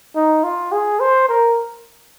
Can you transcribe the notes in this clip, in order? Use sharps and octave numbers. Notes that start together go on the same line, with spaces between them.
D#4
F4
G#4
C5
A#4